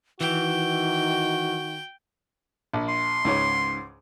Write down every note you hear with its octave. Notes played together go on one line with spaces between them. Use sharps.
D#3 E3 F#4 G5
A#1
C6
C#2 G#2 C#5